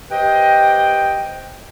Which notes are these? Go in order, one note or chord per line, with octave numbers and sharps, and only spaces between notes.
G4 B4 C5 D#5 G5